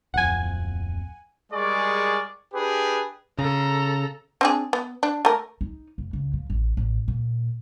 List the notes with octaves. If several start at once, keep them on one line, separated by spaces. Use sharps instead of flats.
D1 F2 F#5 G#5
G3 G#3 G#4 A#4 D5 C#6
D4 G4 G#4 B4
C#3 A4 A#5
C4 D4 G#4
B3
D4
A3 A#4
D#4
F1
C#2
F3
A1
A1
A#2